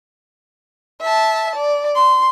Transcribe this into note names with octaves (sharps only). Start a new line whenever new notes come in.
E5 A5
D5
C6